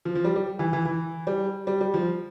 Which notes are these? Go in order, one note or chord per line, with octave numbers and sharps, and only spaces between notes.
F3
F3
G3
G3
E3
E3
E3
G3
G3
G3
F3